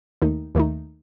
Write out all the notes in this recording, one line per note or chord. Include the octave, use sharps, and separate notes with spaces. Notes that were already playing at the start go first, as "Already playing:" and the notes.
D#2 D#3 A3 D#4
D#2 D#3 A3 D#4